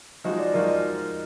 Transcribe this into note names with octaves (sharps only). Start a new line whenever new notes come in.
F3 G#3 D#4 F#4 D#5
D5
F3 G#3 D#4 F#4 A#4